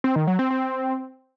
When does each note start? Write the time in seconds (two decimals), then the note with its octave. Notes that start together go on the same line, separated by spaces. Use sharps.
0.04 C4
0.16 D#3
0.27 F#3
0.39 C4
0.51 C4